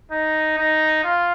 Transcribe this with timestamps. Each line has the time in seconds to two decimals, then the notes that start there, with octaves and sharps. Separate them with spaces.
0.11 D#4
0.58 D#4
1.04 F4